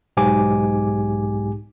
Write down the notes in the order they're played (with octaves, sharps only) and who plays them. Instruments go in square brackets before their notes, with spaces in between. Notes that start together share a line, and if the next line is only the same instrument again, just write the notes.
[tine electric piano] B1 G#2 G4 G#5 D6